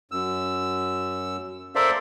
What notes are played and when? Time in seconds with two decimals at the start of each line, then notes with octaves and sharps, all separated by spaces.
0.11 F#2 E6
1.75 A4 A#4 C5 D5 E5 F5